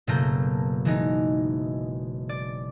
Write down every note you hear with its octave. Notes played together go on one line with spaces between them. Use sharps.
F#1 B2 A3 A#3 A#5 G6
E3 G#3 D#4
D5